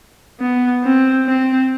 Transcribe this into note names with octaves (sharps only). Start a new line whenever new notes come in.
B3
C4
C4